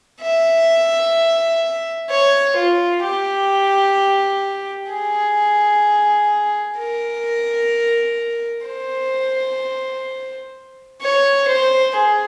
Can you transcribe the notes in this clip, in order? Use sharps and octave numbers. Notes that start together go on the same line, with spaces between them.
E5
C#5
F4
G4
G#4
A#4
C5
C#5
C5
G#4